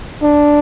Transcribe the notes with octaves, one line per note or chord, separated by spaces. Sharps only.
D4